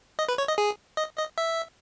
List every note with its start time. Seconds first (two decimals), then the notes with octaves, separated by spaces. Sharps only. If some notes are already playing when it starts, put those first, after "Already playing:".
0.19 D#5
0.29 B4
0.38 C#5
0.48 D#5
0.58 G#4
0.97 D#5
1.18 D#5
1.38 E5